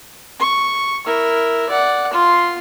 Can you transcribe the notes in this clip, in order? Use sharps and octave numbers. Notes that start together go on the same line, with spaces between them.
C#6
E4 A#4
D5 F#5
F4 C6